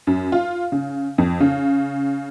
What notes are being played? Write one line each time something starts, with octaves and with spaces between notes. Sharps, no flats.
F#2
F4
C#3
F2
C#3